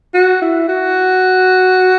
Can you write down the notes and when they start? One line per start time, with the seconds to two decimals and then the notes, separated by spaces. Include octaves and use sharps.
0.14 F#4
0.41 E4
0.68 F#4